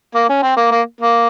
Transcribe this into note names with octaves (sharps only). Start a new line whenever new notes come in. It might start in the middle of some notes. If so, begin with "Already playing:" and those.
A#3
C#4
C4
A#3
A#3
A#3